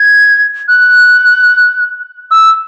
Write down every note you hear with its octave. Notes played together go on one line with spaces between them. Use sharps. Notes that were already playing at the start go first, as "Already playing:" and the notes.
Already playing: G#6
F#6
E6